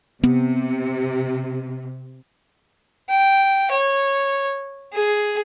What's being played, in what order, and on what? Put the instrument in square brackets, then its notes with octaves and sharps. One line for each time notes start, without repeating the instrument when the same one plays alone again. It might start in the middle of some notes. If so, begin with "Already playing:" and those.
[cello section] C3 [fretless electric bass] B3
[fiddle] G5
C#5
G#4